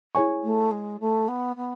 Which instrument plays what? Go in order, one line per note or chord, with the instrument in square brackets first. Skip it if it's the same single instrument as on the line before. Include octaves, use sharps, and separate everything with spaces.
[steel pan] E4 G#4 C#5 G#5 C#6
[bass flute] A3
G#3
A3
B3
B3